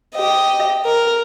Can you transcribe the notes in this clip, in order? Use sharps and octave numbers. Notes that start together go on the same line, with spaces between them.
G4 D#5
A#4